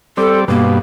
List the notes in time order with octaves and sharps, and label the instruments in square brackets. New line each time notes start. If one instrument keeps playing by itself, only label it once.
[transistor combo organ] G3 C4 D5 [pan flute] A4
[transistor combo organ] G2 B2 [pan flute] A#3